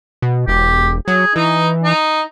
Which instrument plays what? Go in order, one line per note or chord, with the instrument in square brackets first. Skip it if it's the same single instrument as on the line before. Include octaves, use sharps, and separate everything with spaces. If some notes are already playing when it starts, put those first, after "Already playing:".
[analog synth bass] B2
[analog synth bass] E1 [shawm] G4
[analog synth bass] F#3 [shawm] G#4
[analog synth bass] E3 [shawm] D#4
[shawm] D#4